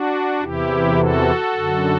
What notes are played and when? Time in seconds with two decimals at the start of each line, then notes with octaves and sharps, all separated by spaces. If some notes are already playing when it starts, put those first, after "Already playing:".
Already playing: D4 F#4
0.41 E2 C3 E3 E4 G4
0.97 F#4 A4
1.54 F#2 D3